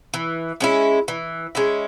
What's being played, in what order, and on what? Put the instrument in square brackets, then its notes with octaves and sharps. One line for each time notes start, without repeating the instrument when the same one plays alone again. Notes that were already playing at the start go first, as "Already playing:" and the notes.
[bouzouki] E3
G#3 C#4 E4
E3
G#3 C#4 E4